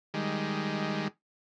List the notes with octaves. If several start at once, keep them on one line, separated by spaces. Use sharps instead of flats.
D#3 G3 G#3